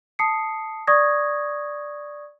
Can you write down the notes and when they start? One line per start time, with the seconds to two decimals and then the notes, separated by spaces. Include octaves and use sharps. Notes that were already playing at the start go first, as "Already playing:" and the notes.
0.19 A5 D#6 C7 C#7
0.87 D5 C#6 D#6 G#6 A#6